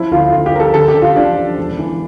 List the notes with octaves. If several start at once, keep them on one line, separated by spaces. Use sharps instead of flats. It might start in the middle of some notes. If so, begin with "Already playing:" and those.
Already playing: F3 E4
D2 F4
D2 F4
G4
F3 A#4
A4
D3 A4
G4
D3
F4
F3 D4
F3
E1
E3